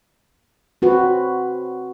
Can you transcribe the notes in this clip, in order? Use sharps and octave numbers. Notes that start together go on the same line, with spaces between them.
C4 F#4 B4